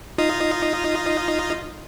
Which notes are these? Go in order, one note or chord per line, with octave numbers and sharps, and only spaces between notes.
D#4 F4 D#5